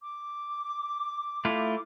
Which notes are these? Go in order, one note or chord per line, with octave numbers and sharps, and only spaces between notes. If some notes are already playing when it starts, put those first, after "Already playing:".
D6
A3 E4 F4